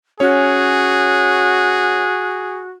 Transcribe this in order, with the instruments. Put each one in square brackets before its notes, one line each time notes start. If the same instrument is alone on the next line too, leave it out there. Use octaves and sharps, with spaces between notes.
[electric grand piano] C#4 C#5 [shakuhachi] F#4 [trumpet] G#4